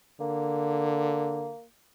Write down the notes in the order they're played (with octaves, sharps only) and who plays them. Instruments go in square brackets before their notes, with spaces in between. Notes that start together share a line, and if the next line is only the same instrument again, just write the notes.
[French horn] D3 [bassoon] A#3